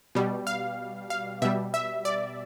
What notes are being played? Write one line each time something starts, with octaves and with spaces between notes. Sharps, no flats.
B2 G3
F5
F5
B2 G3 E5
E5
D5